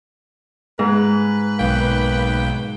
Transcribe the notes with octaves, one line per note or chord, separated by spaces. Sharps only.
G#2 B4
B1 A#3 G5